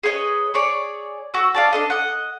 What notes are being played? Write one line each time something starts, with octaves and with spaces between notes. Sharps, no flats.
G#4 B4 C#5 D#5
G#4 C#5 D5
F#4 E6
F4 D5 A5
D4 A4 D#5
D#5 F#5